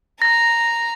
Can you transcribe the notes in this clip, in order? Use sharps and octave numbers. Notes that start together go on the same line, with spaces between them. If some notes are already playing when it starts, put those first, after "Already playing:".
A#5 A#6